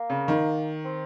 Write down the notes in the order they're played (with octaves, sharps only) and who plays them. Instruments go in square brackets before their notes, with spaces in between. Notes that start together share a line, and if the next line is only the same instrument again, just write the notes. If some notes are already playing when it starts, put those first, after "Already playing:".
Already playing: [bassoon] A#3
[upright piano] C#3
D#3
[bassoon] C4